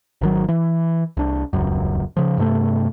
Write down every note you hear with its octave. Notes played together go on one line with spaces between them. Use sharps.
G#1 D#3 F#3
E3
C2 D4
D#1 C#2 F#2
C#3 F3
G2 C3 A3